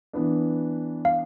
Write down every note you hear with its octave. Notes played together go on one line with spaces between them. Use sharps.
E3 B3 D4
F5